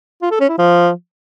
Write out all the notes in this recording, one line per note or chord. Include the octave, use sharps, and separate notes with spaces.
F4
A4
C#4
E4
F3